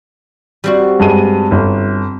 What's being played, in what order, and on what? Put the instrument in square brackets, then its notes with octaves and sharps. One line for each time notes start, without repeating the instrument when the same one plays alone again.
[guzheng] G3 C4 F#4
[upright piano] G2 G#3 D#7
G1